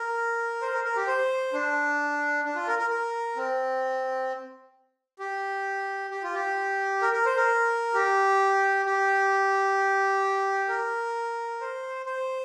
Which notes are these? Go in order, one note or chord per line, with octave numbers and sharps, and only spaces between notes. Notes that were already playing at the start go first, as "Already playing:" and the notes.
Already playing: A#4
C5
A#4
A#4
G4
C5
D4
D4
F4
A#4
A#4
A#4
C4
G4
G4
F4
G4
A#4
A#4
C5
A#4
G4
G4
A#4
C5
C5